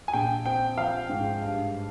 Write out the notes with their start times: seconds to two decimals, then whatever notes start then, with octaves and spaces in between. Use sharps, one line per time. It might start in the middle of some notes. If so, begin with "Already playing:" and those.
0.08 G#5
0.13 A#1 G5
0.46 C4 G5
0.77 F3 F5
1.09 G#2
1.42 G2